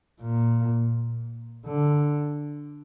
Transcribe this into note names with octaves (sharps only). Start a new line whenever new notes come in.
A#2
D3